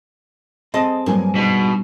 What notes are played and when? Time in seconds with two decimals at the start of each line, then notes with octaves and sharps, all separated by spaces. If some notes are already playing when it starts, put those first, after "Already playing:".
0.74 C4 G#4 A4 D#5
1.06 G2 F#3 A#3 G#5
1.36 G#2 B2 B3